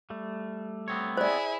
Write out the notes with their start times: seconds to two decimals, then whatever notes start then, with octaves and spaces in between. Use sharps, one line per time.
0.10 G3 A3
0.88 B3 C4 C#5
1.17 E4 G#4 C5 D5